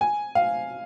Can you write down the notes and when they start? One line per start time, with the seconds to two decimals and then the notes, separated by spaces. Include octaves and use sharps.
0.01 G#5
0.35 F5